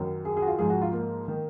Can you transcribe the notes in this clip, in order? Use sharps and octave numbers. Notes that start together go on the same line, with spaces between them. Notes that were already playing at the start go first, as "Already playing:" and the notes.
Already playing: F#2 D#3
G#4
G#4
F#4
F4
G#2 F3 G#4
F#4
F4
A#3
D#3